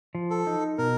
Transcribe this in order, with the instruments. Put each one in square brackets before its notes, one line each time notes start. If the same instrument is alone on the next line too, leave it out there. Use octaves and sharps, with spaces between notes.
[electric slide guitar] F3
[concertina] A4
[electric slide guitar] D#4
[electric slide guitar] B2 [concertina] A#4